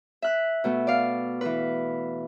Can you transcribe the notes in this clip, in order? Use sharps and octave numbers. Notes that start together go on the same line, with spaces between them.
E5 F#6
B2 A3
D5 F5
E3 B4